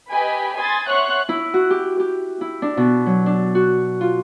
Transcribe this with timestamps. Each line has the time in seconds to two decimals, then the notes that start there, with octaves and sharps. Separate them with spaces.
0.11 G4 B4 D#5 G5 G#5 B5
0.57 G#5 B5 C6 D#6 G#6 A6
0.88 C#5 E5 F#5 C6 C#6 F#6
1.29 E4
1.54 F#4
1.70 G4
2.00 G4
2.41 E4
2.62 D4
2.77 B2
3.06 F#3
3.26 D4
3.55 F#4
4.01 F4